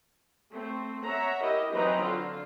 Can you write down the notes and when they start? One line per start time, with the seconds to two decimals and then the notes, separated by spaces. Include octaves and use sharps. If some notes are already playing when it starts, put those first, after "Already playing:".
0.52 A3 C4
1.03 C#5 E5 F#5 A#5
1.42 E4 G4 A#4 D#5 E5
1.72 E3 F#3 C4 D#4 B4 A#5
2.00 D3 F4